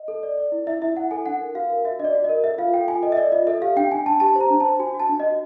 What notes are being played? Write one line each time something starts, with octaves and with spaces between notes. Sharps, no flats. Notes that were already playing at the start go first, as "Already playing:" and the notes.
Already playing: D#5
A4
D5
D5
E4
E4 E5
E4 E5
E4 F#5
A4 G#5
D4 F#5
A#4
F#4 F5
A#4
F#4 E5
D4 D#5
D5
F#4
A#4 D#5
A4 E5
F4 F5
A4 G5
F4 G#5
A4 D#5
E5
D5 D#5
F4 D#5
A4 E5
G4 F5
D4 G5
D4 G#5
D4 A5
G4 A5
C5
A#5
D4
C5 A5
F#4 G#5
F#4
A5
D4
F#4 D#5